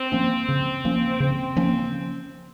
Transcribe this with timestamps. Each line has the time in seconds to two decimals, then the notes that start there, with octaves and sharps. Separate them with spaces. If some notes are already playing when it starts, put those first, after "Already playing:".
Already playing: C4
0.12 F3 A#3 C#4
0.48 C#3
0.85 F3 A#3 C#4
1.20 C#3 C4
1.56 F3 A#3 C#4